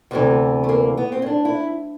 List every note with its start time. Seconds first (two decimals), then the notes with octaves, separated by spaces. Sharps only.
0.11 D2 C3 E3 B3
0.64 A3
0.69 A#3
0.97 B3
1.12 C4
1.22 C#4
1.26 D4
1.45 E4